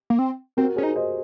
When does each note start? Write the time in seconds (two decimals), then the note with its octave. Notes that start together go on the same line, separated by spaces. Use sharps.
0.10 A#3
0.19 C4
0.57 C4 F#4 A#4
0.76 C#4 G#4 C5
0.83 D#4
0.95 C5 D#5